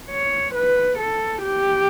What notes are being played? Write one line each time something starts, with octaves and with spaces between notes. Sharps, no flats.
C#5
B4
A4
G4